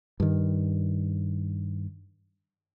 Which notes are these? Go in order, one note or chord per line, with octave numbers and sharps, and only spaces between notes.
G2 D#3